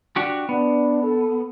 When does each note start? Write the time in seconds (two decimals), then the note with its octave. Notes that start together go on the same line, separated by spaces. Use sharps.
0.16 D4 F#4 G4
0.49 B3 D4
1.03 A4